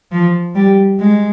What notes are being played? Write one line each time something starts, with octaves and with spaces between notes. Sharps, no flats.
F3
G3
G#3